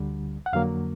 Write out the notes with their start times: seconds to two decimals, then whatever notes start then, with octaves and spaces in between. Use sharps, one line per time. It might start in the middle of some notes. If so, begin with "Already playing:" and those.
Already playing: D2 D3 G3
0.46 F#5
0.53 F2 D3 F#3 A#3 F5